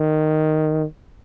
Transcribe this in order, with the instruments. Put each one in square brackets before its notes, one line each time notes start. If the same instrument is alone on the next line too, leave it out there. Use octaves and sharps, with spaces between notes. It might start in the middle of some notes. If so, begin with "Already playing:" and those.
Already playing: [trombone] D#3